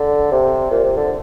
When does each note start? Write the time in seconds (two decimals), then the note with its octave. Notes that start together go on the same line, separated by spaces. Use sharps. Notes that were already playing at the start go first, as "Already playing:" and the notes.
Already playing: D3
0.32 C3
0.71 A#2
0.84 C3
0.97 D3